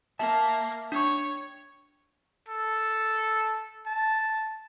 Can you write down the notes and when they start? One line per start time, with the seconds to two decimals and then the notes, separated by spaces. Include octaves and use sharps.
0.19 A#3 E5 A5
0.92 D4 C#5 C#6
2.48 A4
3.86 A5